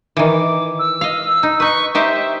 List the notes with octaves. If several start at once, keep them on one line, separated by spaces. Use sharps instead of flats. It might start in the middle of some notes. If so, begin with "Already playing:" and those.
D#3 E3 D6
E6
D#5 F5
D#4
D#4 B4 C#6
D#4 G4 C5 E5